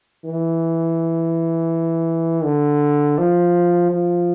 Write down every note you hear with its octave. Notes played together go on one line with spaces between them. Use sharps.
E3
D3
F3
F3